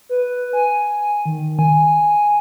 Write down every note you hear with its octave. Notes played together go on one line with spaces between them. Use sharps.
B4
G#5
D#3
G#5